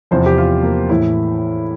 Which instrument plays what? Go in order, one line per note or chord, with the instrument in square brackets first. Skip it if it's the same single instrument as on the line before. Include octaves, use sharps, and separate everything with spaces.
[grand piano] E2 C3 F3 C5
G4
F4
A#3
A2 E3 E4